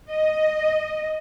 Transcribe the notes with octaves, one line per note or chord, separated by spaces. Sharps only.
D#5